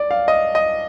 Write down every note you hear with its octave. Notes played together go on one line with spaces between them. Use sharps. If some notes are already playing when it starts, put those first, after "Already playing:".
Already playing: D5
F5
D#5
D#5